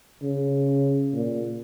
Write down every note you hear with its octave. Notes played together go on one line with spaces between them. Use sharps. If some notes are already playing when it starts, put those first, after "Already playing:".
C#3
A#2